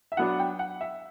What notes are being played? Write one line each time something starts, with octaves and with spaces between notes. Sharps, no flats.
E5
F#3 B3 D4 F#5
G5
F#5
E5